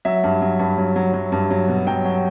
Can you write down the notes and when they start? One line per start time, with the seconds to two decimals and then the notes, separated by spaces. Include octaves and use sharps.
0.05 F#3 E5
0.24 G2
0.42 F#3
0.59 G2
0.78 F#3
0.96 F#3
1.14 F#3
1.32 G2
1.51 F#3
1.68 B2
1.87 F#3 G5
2.05 F#3